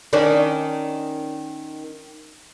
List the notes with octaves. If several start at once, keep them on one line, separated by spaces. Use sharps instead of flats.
D#3 C#4 D4